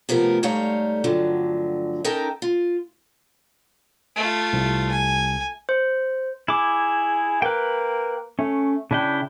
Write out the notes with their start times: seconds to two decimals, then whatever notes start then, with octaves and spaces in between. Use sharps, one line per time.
0.09 C3 F3 A3 B3 A#4
0.43 G#2 G3 A3 C#5 F5 A#5
1.04 D2 G2 D3 F3 F#3
2.04 C#4 D#4 A4 A#4 G5
2.42 F4
4.16 A3 F4
4.53 C2
4.91 G#5
5.69 C5
6.48 E4 G#4 D6
7.42 A#3 B4 G5
8.39 A3 C#4
8.91 C#3 D4 E4 G5